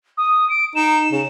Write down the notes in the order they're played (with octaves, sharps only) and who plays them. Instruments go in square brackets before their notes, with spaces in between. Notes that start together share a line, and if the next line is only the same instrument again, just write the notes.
[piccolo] D#6
D7
[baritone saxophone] D#4 [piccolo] E7
[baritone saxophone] C#3